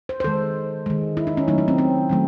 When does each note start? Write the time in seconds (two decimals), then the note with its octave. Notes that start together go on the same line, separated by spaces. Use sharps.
0.09 C5
0.20 C5
0.24 D#3 G#3 A4
0.86 D#3 G#3
1.17 E4
1.27 D#4
1.37 C#4
1.48 D#3 F#3 A3 D#4
1.58 D#4
1.68 C4
1.78 C4
2.09 D#3 F#3 A3